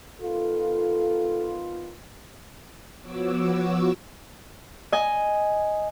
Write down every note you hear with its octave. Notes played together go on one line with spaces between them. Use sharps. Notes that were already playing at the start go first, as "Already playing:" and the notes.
D#3 B3 F4 A4
F3 B3 F#4 C#5 D6 E6
D#5 G#5